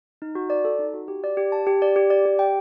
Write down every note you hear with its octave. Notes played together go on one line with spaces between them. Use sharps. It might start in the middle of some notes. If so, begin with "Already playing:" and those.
D#4
F#4
D5
A4
D#4
F#4
G4
D5
G4
A5
G4
D5
G4
D5
G4
G5